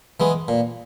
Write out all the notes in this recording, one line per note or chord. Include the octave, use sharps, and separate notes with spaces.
E3 G#3 B3
A#2